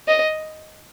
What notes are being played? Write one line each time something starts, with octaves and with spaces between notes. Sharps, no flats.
D#5